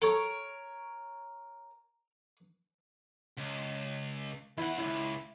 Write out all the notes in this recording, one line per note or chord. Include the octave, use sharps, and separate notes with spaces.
A4 A#4 C#5
C#2
E2 E4 F#5
C#2 C#3 E4